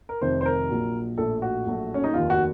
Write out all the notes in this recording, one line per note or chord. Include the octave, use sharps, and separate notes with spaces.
A#4
F1 F2 C3 D#3 C5
C5
A#4
A#1 A#2 F#3
A#1 A2 A3 A4
F#4
A#1 A2 F#3 A3
C#4
D#4
F1 D#2 D#3 F4
F#4